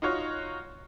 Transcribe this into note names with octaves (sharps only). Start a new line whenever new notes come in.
D#4 F4 F#4 C#5 C#6